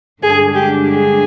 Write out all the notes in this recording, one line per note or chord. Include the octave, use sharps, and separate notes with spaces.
G2 D3 G#3 D4 G#4
G4
G#4